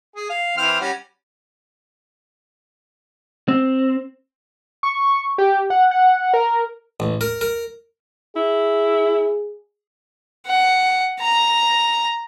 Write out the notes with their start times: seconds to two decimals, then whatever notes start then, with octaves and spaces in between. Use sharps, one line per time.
0.16 G#4
0.30 F5
0.58 E3 C4 F6
0.80 G3 C#4 F#4
3.48 C4
4.83 C#6
5.38 G4
5.70 F#5
5.91 F#5
6.34 A#4
7.00 A1
7.21 A#4
7.41 A#4
8.36 E4 G#4
10.47 F#5
11.20 A#5